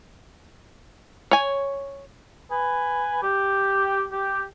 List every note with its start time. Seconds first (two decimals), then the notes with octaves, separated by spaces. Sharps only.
1.31 C#5 G#5
2.50 B4 G#5
3.23 G4
4.11 G4